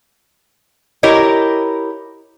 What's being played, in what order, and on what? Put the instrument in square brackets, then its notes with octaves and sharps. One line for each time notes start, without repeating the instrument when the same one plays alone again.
[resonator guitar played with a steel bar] E4 G4 A#4 C#5 D#5